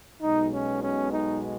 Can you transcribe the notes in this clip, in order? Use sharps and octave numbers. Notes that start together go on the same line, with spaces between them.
B1 B2 G#3 D#4
C#4
C#4
D#4